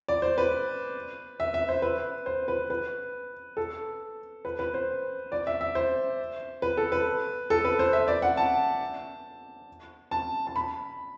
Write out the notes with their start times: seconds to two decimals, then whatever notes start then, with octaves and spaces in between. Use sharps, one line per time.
0.08 D5
0.22 C5
0.38 B4
1.40 E5
1.54 E5
1.69 C5
1.82 B4
2.26 C5
2.48 B4
2.70 B4
3.57 A4
4.45 B4
4.59 B4
4.74 C5
5.32 D5
5.47 E5
5.61 E5
5.75 C5
6.62 B4
6.77 A4
6.92 B4
7.50 A4
7.65 B4
7.79 C5
7.93 E5
8.08 D5
8.22 F#5
8.37 A5
10.11 A5
10.47 A5
10.56 B5